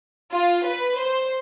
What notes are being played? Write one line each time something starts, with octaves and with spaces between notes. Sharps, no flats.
F4
B4
C5